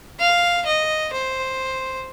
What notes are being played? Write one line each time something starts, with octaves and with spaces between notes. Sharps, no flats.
F5
D#5
C5